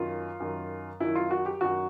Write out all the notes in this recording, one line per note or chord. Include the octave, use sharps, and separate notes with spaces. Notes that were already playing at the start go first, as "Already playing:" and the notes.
Already playing: F#2 D#3 F4
F#2 D#3
F#2 D#3 E4
F4
F#4
G4
F#2 D#3 F#4